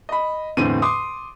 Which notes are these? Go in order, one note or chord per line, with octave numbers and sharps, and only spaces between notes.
D#5 B5
E2 A2 D3 C4 D#7
C6 D6 D#6